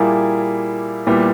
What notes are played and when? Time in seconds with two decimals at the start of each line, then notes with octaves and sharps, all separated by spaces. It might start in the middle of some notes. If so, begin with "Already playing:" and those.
Already playing: A#2 G3 A#3 E4 G#4
1.07 A#2 G3 B3 E4